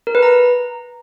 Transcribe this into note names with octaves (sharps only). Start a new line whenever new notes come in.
A#4
B4
A#5